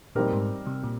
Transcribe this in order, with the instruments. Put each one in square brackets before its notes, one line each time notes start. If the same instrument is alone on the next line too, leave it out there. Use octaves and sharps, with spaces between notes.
[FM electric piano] A#2 [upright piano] G3 C4 D#4 G4 A#4
[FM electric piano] G#2
C3
A#2